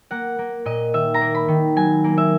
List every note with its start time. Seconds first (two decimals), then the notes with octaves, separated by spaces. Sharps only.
0.11 A#3 F#5
0.39 A#3
0.65 A#2 D#5
0.94 D#3 E5
1.14 A#5
1.21 A#3
1.35 B5
1.48 D#3
1.76 F#3 G#5
2.04 A#3
2.18 E5